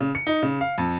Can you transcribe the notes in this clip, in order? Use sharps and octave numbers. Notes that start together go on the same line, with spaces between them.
C#3
C#7
D#4
C#3
F5
F2